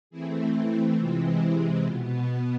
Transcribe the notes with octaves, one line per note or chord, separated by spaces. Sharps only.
E3 A3 C4 E4 G#4
E4
C3 E3 G#3 C4 F4
E4
B2 B3 F4